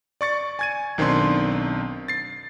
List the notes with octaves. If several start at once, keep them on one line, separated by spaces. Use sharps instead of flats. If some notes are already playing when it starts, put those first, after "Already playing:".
D5 C#6 A6 C#7
G#5 G#6 D#7
B1 D#3 C4 D4 C6
A6 C7